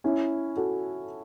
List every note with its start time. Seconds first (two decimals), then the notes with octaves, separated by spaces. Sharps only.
0.04 C#4 E4
0.57 F#4 A4